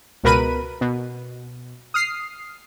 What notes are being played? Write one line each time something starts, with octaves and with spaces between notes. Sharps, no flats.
C#2 B2 A#4 B4 B5 D#7
B2
D#6 F6 C7